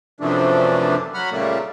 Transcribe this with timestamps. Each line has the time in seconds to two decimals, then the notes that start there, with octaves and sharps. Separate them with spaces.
0.20 F#2 C3 E3 F3 A3 D4
1.14 F#3 F#5 B5 F6
1.32 A#2 C#3 G3 A3 A#3